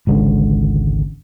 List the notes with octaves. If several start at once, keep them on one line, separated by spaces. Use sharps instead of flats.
G#1 C#2 D3